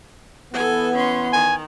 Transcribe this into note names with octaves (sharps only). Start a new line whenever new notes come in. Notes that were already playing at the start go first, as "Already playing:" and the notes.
E3 B3 A4 G#5
C#4 C6
D#3 G#5